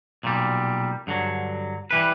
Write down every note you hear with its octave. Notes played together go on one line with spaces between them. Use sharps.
B1 A#2 G3
G2 D3 F#3
E3 G3 B4